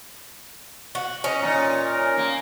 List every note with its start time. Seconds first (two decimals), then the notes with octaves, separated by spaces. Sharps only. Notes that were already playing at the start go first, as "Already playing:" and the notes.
0.95 F#4
1.24 C#4 D#5
1.42 A#2 D#4 A#5
1.85 A#4
2.17 A#3